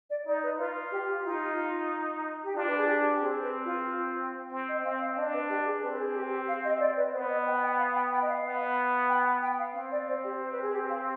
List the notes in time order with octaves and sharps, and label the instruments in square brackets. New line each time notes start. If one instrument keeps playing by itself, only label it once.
[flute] D5
[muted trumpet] D#4 [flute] D5
[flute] B4
[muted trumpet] F4 [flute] B4
[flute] G4
G4
[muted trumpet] D#4 [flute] F4
[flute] G4
[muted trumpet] D4 [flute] F4
[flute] B4
G#4
G4
G4
[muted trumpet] C4 [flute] G#4
[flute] B4
F4
[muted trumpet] C4
[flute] D#5
[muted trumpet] C4 [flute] F5
[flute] F5
[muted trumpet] D4 [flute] D#5
[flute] B4
G4
G#4
[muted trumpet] C4 [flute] B4
[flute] B4
G#4
G4
G4
F5
D#5
D5
B4
[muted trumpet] B3 [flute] C5
[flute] D#5
G5
G5
F5
G5
G5
D#5
F5
[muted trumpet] B3
[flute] G5
G5
F5
[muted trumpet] C4 [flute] F5
[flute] D5
C5
G4
C5
B4
G#4
G4
F5